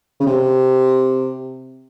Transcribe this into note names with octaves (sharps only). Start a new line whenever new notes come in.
C#3
C3